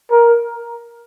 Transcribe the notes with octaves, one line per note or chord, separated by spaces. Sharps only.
A#4